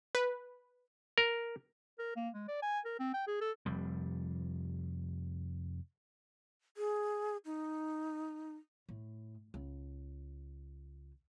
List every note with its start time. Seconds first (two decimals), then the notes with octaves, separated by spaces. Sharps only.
0.15 B4
1.18 A#4
1.99 A#4
2.16 A#3
2.34 G#3
2.48 D5
2.62 G#5
2.85 A#4
2.99 C4
3.14 G5
3.27 G#4
3.41 A4
3.66 F1 F2 G3
6.77 G#4
7.45 D#4
8.89 A2
9.54 C#2